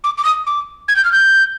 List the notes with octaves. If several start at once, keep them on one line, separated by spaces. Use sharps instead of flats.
D6
D6
D#6
D6
G#6
G6
F6
G6